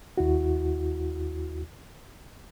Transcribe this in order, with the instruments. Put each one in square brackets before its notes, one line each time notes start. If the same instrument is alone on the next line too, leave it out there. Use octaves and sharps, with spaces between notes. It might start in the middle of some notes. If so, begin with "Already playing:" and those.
[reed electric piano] D#2 E4 F#4